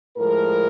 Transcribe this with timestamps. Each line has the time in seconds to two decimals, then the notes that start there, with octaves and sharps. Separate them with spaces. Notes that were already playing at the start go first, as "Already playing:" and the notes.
0.18 A2 F3 G#3 A#4